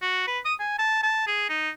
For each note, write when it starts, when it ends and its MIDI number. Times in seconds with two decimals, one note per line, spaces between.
0.02 0.22 66
0.27 0.39 71
0.45 0.54 87
0.59 0.75 80
0.79 0.99 81
1.03 1.26 81
1.27 1.45 68
1.49 1.70 63